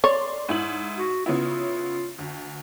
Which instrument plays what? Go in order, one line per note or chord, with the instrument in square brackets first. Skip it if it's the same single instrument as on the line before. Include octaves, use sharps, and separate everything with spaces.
[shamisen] C#5 [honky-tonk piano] D5 C6
[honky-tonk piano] G#2 E4 F#7
[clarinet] F#4
[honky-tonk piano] C#3 B3 E4 [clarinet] F4
[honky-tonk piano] D2